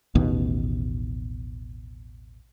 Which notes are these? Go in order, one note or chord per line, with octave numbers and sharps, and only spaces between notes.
A1 D#2 B2